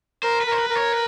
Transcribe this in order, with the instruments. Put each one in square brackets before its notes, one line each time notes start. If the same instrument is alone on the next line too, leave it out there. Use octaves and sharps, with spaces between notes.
[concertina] A#4 [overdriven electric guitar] C5
[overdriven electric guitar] B4
[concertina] A#4 [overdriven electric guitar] C5
[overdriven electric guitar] B4
[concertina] A#4
[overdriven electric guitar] C#5
B4